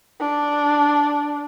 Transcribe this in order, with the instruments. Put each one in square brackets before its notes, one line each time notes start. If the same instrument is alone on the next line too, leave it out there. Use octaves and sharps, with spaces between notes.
[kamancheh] D4